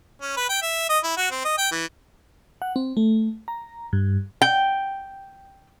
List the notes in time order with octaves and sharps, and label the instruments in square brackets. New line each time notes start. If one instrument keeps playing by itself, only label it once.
[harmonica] C#4
B4
G5
E5
D#5
E4
F#4
C4
D#5
G5
E3
[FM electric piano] F#5
C4
A3
A#5
G2
[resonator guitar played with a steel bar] G5